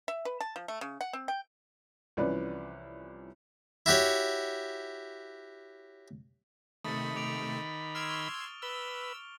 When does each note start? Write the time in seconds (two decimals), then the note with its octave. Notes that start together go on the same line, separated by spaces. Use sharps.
0.08 E5
0.25 B4
0.41 A5
0.56 F3
0.68 A3
0.81 C#3
1.01 F#5
1.13 C4
1.28 G5
2.17 C2 E3 F3 C#4 B4 D5
3.86 E4 F#4 G4 C#5
6.84 C3 D#3 A3 B5 D#6 A6 C#7
7.16 D6 D7 F7
7.95 C6 E6 F6 G#6 D7 F7
8.10 C#6 F7 G7
8.63 B4 E6 G7